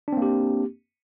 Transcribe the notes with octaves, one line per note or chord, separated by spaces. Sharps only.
A#3 C4 D4 G4